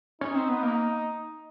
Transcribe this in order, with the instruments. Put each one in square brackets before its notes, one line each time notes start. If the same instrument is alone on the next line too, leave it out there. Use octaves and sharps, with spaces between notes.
[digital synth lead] C#4 [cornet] D#4
[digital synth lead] C4
B3
A#3